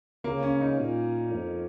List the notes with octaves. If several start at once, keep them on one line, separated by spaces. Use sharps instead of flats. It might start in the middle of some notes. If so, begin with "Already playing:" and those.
C#3 A#3
C#4
D#4
A#2
F2